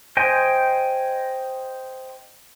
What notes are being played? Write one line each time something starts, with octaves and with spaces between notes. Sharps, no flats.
C5 D#5 G5 G#5